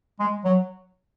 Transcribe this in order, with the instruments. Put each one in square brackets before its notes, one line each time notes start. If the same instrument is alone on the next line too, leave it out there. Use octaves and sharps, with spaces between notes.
[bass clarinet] G#3
F#3